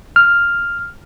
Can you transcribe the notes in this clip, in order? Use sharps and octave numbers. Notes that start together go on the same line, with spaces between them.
F6